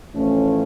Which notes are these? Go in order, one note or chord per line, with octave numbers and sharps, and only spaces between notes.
A1 A2 F3 A3 C#4